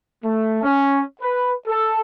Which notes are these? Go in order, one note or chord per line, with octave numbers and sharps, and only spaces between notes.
A3
C#4
B4
A4